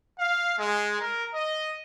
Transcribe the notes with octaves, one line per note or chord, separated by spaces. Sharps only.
F5
G#3
A#4
D#5